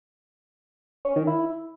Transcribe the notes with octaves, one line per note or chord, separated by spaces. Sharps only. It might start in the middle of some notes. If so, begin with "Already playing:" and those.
C#4
D#3
E4